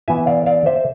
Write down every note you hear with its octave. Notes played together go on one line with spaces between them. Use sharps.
E3 B3 E4 E5 G#5
D5 F5
D5 F5
C5 E5